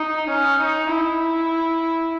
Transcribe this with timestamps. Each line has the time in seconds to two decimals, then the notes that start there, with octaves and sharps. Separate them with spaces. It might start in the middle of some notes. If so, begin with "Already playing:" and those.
Already playing: D#4
0.29 C#4
0.60 D#4
0.90 E4